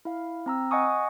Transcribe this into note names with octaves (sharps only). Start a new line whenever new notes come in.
E4 F5
C4 A#5 E6
D#5 F#5 G#5 C#6 D#6